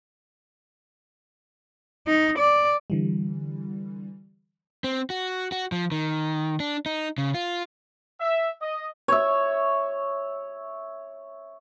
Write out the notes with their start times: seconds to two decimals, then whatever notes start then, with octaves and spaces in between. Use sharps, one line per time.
2.07 D#4
2.38 D5
2.90 D3 E3 G3
4.84 C4
5.10 F#4
5.52 F#4
5.72 F3
5.92 D#3
6.60 D4
6.86 D#4
7.18 C#3
7.34 F4
8.20 E5
8.62 D#5
9.08 C#5 E5